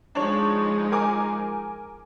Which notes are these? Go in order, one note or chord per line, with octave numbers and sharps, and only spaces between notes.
F3 G#3 D4 D#4 C#5
A#4 G#5 D6